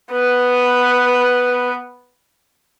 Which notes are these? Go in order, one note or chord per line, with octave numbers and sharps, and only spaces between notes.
B3 B4